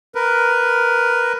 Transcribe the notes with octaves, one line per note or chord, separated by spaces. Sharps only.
A#4 B4